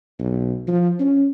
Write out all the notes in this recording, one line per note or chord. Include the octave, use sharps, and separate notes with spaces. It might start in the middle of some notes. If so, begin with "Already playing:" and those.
B1
F3
C#4